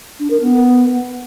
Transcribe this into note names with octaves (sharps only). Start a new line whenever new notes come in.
D4
A#4
B3